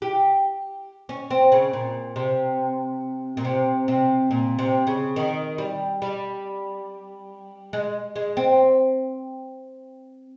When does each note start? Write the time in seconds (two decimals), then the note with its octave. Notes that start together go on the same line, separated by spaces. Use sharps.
0.02 G4
1.09 C#4
1.31 C4
1.52 C#3
1.73 A#2
2.16 C3
3.37 A#2
3.45 C3
3.88 C3
4.31 A#2
4.59 C3
4.87 C#3
5.16 D#3
5.58 G3
6.02 G3
7.73 G#3
8.16 G#3
8.37 C4